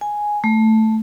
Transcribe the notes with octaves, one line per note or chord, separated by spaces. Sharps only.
G#5
A3